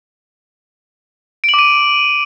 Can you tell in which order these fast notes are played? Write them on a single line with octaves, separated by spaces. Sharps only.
D7 F#7 D6 D#7